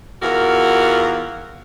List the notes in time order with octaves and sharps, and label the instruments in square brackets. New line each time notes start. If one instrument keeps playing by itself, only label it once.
[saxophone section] E2 F4 F#4 A#4